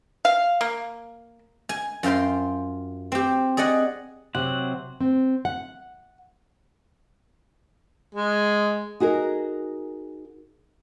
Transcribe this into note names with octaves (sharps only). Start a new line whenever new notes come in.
F5
A#3
G#5
F#2 F4 C5 G5 C6
C4 G4
G#4 D5 D#5 F#5
C3 F#3 C4 F#5
C4
F#5
G#3
D#4 F#4 G#4 A#4